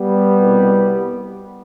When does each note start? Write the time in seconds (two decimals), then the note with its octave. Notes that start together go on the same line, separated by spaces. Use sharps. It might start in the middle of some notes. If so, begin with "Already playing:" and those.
Already playing: G3 B3
0.38 C2 B2